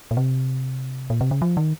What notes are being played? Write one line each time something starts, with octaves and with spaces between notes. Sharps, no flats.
A#2
C3
A#2
C3
C#3
F3
D#3